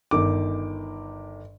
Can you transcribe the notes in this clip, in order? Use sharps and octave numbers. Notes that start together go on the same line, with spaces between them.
G1 D#3 D6